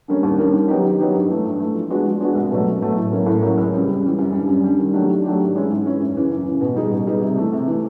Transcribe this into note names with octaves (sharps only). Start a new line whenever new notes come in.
D3 G3 A#3 C#4
D#2
D3 G3 A#3 C#4
D#3
F#3 B3 D#4 G4
D#3
F#3 B3 D#4 G4
G2
E3 A3
G2
E3 A3
F3
G#3 B3 D4 F#4
F3
G#3 B3 D4 F#4
C2
B2 F#3 A3
C2
B2 F#3 A3
A2
F#3 A#3 C#4 E4
A2
F#3 A#3 C#4 E4
C#2
C#3 E3 G3
C#2
C#3 E3 G3
F#2
D3 G3
F#2
D3 G3
D#3
F#3 A3 D4 G4
D#3
F#3 A3 D4 G4
G#2
E3 G#3 C#4 E4
G#2
E3 G#3 C#4 E4
F#2
C#3 E3
F#2
C#3 E3
B2
G3 B3 D#4 G#4
B2
G3 B3 D#4 G#4
C3
E3 A3
C3
E3 A3